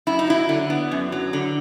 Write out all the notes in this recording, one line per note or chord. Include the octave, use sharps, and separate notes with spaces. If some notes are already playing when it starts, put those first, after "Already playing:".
F#2 E4
D#4
F#3 E4
D3
B3
F#2
F#3
D3